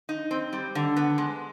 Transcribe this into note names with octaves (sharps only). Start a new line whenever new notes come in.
D#4
C4
G3
D3
B3
G#3